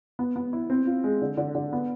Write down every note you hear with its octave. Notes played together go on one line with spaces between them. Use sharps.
B3
B3
E4
C4
F4
G#3
D3
D3
D3
B3